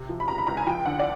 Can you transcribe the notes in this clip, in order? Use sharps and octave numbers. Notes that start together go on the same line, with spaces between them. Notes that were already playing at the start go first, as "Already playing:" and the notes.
Already playing: C3
F3
B5
C#2 A#5
B5
C#2 A#5
G#5
F3 G5
D3 F#5
D5